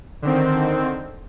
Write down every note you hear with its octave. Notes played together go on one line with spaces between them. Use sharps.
D3 D#3 C4